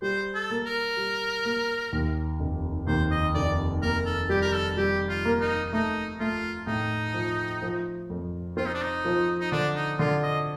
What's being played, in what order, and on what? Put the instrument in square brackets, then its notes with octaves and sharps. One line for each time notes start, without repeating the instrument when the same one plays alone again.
[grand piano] G3 [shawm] C5
[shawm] A4
[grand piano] A#3
[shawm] A#4
[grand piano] G3
A#3
D#2
F1
[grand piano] D#2 [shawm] C5
[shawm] D#5
[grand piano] F1 [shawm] D5
[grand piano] A#3 [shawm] A#4
[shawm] A4
[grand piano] G3 [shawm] G4
[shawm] A#4
A4
[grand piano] G3 [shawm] G4
[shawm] F4
[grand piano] A#3
[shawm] D#4
[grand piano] A3 [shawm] D#4
[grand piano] A3 [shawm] F4
[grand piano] A2 [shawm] D#4
[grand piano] F3
F3
F2
[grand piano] C4 [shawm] F4
[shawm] D#4
D4
D#4
[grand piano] F3
[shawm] D#4
[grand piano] D3 [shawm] D4
[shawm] D#4
[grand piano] D3 [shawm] F4
[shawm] D#5